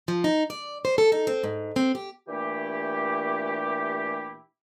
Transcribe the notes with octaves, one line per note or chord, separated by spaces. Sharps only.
F3
D#4
D5
C5
A4
D#4
C4
G#2
C4
G4
A#2 E3 A3 D4 E4 G4